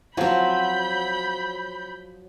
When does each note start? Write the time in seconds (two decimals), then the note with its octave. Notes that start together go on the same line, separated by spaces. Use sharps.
0.17 F3 F#3 C4 B5 G6